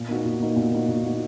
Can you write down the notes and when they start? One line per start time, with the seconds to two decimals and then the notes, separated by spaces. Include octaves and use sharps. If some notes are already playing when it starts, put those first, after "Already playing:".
Already playing: A#2
0.08 A#3 D#4 F#4
0.25 A#2
0.40 A#3 D#4 F#4
0.56 A#2
0.72 A#3 D#4 F#4
0.88 A#2
1.04 A#3 D#4 F#4